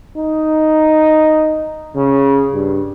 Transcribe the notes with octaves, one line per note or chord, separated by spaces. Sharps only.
D#4
C#3
G2